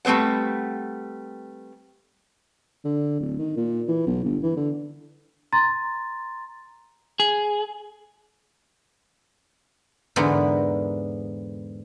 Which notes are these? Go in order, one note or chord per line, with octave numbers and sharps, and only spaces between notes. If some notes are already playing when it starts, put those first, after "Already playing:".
G3 A3 C4 B4 F#5
D3
D1
D#3
A#2
E3
B1
G1
E3
D3
A#5 C6 A6
G#4
E2 G#2 D3 B3 A#4